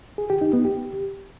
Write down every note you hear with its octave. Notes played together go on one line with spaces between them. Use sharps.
G#4
G4
D#4
B3
G4